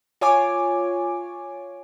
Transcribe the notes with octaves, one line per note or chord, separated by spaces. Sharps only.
F4 C#5 G#5 D6